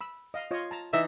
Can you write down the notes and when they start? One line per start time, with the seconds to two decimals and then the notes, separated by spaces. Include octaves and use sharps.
0.01 B5 E6
0.34 D#5 F5
0.51 F4 C#5 D#5
0.71 A5 A#5
0.93 E3 D#4 E5